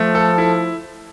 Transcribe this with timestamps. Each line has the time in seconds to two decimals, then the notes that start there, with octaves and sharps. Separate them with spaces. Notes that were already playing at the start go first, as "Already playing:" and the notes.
Already playing: F3 A3
0.15 A4
0.38 E4